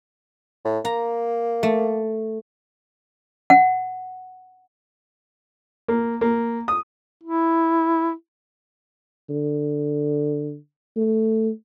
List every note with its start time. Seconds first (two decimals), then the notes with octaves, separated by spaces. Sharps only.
0.65 A2
0.85 A#3 A#5
1.63 A3
3.50 F#5
5.88 A#3
6.21 A#3
6.68 D#6
7.23 E4
9.30 D3
10.97 A3